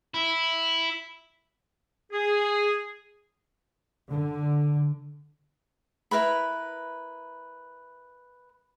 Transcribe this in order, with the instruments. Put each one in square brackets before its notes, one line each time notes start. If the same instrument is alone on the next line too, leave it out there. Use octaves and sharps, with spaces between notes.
[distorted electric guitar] E4
[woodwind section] G#4
[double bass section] D3
[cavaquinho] E4 A#4 B4 B5